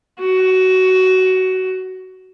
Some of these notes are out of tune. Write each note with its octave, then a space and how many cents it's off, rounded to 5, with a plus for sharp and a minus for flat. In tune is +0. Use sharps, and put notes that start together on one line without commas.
F#4 +15